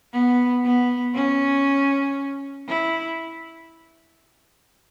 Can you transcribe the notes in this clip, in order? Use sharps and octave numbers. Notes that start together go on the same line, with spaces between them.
B3
B3
C#4
E4